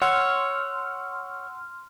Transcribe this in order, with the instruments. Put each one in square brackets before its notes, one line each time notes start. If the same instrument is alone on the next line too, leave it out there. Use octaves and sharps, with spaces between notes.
[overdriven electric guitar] C#5 [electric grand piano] F#5 [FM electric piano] C6 F6 [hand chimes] E6